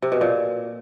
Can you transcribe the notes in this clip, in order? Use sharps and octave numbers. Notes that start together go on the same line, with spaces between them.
C3
B2
A#2